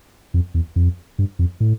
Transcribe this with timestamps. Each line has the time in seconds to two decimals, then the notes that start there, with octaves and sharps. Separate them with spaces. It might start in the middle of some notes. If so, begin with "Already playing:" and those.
0.34 F2
0.54 E2
0.76 F2
1.19 G2
1.39 F2
1.60 A2